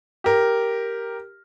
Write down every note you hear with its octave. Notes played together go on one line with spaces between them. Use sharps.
G4 A#4